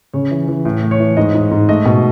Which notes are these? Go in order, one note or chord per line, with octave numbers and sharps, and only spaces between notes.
C#3 C#5
E3
E3
A2
A3
C#5
E3
G#2 D#5
G#2
G#2
A3 D#5
B2